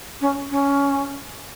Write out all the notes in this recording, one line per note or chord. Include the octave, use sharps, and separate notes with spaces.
C#4
C#4